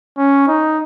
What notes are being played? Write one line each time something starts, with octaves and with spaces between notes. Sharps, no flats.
C#4
D#4